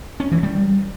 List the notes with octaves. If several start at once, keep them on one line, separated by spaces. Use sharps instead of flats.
C#4
E3
G3